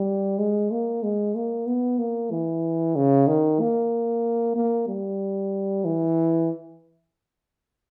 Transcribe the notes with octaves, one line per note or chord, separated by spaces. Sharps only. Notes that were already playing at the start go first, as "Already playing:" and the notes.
Already playing: G3
G#3
A#3
G#3
A#3
B3
A#3
E3
C#3
D#3
A#3
A#3
G3
E3